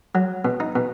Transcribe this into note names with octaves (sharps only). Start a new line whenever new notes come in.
F#3
B2
D#4
B2